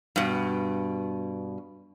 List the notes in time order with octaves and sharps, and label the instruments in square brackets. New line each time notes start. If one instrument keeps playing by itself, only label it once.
[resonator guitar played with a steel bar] G2 B2